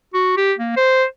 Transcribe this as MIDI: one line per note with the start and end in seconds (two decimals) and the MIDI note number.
0.14 0.34 66
0.38 0.53 67
0.59 0.74 58
0.77 1.05 72